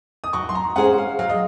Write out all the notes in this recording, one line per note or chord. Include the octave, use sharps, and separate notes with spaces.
D#6
F#3 C#6
C6
A#5
C#4 G#4 C5 F#5
F5
F#3 F5
D#5